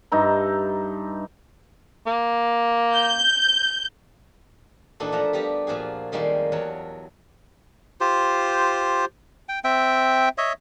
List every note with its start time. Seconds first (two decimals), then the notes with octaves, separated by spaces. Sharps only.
0.12 G2 D#4 E5 A#5
2.06 A#3
2.93 G6
5.00 A#2 E3 D4 D#4 F#4 A4
5.12 F3 A3 E5 F#5 A#5
5.33 G3 B3 G4 A#5
5.67 A#2 F3 F#4 G#4
6.12 F2 D#3 G3 G#3 A#3 C5
6.52 E2 F#3 A#4 C#5 A5
8.00 F4 G4 C5
9.49 G5
9.64 C4 E5 G5
10.38 C#5 D#5 E5